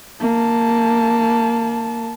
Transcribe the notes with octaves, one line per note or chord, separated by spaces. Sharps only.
A#3 A5